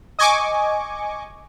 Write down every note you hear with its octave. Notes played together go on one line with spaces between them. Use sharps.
D#5 G#5 C#6 D6